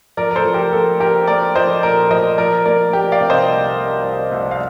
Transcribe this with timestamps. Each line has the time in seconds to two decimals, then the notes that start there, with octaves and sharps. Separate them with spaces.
0.17 F3 A#4 D5
0.31 A#4
0.36 A4 C5
0.45 F3
0.54 G4 A#4
0.73 A#3 A4
1.00 A#3 G4 A#4
1.28 A#3 A#4 D5
1.55 F3 C5 D#5
1.83 A#2 A#4 D5
2.11 F3 C5 D#5
2.38 F3 A#4 D5
2.65 A#3 A#4 D5
2.93 A#3 G4
3.12 D5 F5
3.21 C3
3.30 C5 D#5
3.49 C2
3.76 A#3
4.04 C2
4.32 C2
4.51 F5